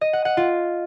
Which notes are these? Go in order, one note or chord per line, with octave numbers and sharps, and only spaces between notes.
D#5
F#5
F#5
F4